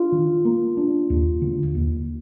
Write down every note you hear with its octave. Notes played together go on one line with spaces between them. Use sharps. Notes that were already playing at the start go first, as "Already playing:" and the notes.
Already playing: D4 F4
D#3
A#3
D4
D#2
D3
D#2